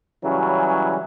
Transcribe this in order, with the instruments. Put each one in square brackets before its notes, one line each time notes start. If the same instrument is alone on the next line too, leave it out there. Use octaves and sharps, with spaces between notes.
[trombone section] C#3 E3 F#3 G3 C#4